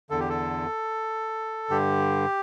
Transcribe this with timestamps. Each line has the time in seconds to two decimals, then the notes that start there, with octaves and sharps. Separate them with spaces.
0.10 E2 D3 A4
0.20 G4
0.29 A4
1.70 G2 D3 G4